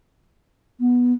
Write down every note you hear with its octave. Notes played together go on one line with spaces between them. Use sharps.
B3